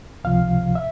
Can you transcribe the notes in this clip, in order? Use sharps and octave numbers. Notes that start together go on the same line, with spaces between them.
C#2 C3 F3 F5
E5